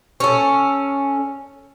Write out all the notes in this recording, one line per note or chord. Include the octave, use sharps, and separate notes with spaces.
C#4 A4